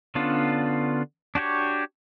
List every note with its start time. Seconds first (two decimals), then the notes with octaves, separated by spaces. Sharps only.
0.15 D3 B3 C#4 D4 F4
1.35 D4 F#4 G4 C#5